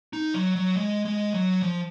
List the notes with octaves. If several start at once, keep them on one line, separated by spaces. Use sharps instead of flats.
D#4
F#3
F#3
G#3
G#3
F#3
F3